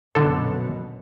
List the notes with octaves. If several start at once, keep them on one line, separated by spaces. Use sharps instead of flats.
A#1 F#2 B2 D3 A4